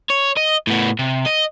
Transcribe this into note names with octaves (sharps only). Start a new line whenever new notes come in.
C#5
D#5
A2 B3
C3
D#5